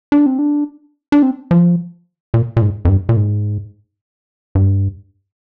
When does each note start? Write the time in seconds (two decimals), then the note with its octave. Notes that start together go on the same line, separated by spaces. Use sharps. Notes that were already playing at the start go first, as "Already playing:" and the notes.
0.12 D4
0.26 C4
0.39 D4
1.12 D4
1.23 C4
1.51 F3
2.34 A#2
2.57 A#2
2.62 G#2
2.85 F2
2.89 G2
3.09 A#2
3.16 G#2
4.55 G2